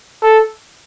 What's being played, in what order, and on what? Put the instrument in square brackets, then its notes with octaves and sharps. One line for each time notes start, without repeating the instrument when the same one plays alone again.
[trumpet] A4